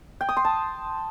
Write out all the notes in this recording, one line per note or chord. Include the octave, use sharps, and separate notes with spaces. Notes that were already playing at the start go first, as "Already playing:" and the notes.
G5
D#6
C6
A5